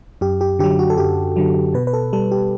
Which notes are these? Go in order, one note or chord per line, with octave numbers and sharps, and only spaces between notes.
F#2 G4
G4
D3 F#3 G4
F#4
A4
F#2 G4
D3 F#3
B2 B4
B4
A4
G3 A4
G4